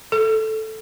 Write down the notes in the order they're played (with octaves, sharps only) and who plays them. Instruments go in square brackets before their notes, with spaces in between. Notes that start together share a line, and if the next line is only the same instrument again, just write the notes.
[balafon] A4